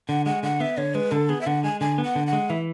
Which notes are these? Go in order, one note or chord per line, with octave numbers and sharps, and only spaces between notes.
D3 F#5
G#3 F#5
D3 F#5
B3 E5
D3 C#5
G#3 B4
D3 A4
B3 G#4
E5
D3 F#5
G#3 G#5
D3 G#5
B3
F#5
D3
F#5
G#3
E3 E5